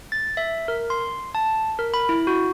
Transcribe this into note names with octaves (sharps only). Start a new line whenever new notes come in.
A6
E5
A#4
C6
A5
A#4
B5
E4
F#4